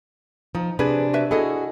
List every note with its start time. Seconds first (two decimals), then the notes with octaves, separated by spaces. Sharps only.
0.55 F3 D#4
0.79 C3 D4 G#4 B4
1.13 F#4 B4 E5
1.31 E4 F#4 G#4 A4 D#5